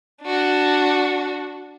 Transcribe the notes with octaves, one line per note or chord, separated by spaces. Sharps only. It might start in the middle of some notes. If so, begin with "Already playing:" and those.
D4 F#4